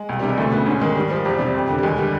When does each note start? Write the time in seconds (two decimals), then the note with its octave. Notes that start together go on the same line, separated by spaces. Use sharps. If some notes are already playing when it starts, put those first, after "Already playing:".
Already playing: G#3
0.09 C2
0.19 C3 G3
0.29 G#3
0.38 D2 A3
0.52 C#3 B3
0.66 G#2 C#4
0.81 D#3 G#3
0.96 G#2 G3
1.10 F3 G3
1.25 E2 G3
1.39 C3
1.55 F2
1.69 D3
1.78 G3
1.83 D#2 G#3
1.98 D3 G3